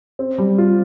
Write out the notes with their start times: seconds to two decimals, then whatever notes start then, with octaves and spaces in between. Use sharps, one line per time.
0.19 C4
0.38 G3
0.58 F4